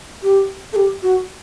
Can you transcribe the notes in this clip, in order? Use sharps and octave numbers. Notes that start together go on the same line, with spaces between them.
G4
A4
G4
F#4